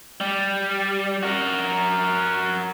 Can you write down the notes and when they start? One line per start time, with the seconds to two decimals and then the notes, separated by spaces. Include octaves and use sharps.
0.21 G3
1.23 F#4 A#4